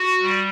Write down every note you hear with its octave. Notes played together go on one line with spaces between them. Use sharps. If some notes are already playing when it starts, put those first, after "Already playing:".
Already playing: F#4
G3